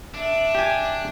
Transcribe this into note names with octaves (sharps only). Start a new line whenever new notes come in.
D4 E5
G4 G#5